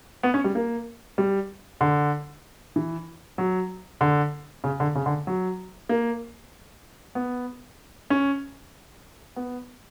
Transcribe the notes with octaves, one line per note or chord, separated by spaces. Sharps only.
B3
C#4
G3
A#3
G3
D3
E3
F#3
D3
C#3
D3
C#3
D3
F#3
A#3
B3
C#4
B3